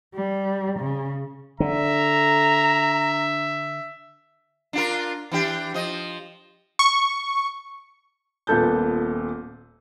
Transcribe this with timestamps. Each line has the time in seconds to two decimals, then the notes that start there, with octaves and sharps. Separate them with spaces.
0.15 G3
0.79 C#3
1.60 D3 E5 A#5
4.73 D4 F4 A#4
5.32 E3 D4 G4
5.74 F3 D#5
6.79 C#6
8.47 D#1 A#2 B3 A4 A5 G6